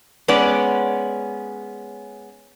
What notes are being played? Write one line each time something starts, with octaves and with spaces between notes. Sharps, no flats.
G#3 B3 C#4 D5